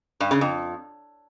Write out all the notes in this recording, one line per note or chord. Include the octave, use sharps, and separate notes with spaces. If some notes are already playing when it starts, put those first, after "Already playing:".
G2
C#3
F2